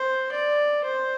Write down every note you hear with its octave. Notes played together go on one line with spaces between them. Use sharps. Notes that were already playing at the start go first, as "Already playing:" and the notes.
Already playing: C5
D5
C5